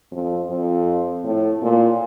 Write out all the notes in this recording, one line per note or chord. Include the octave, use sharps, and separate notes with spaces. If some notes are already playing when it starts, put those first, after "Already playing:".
F2
F2
A2
A#2